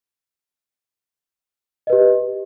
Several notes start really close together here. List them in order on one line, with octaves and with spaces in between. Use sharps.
D#5 B4 G4